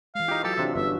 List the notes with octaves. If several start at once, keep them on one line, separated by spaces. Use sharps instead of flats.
E3 G#3 F5
D#4 F4 G4
F#3 G4 A4
C3 E3 D4 F4 E5
G1 C#4 F#4 E5